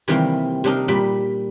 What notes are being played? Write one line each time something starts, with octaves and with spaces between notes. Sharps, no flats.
C3 D#3 E3 G3 A#3 C4
C3 D4 D#4 A#4
A#2 G3 B5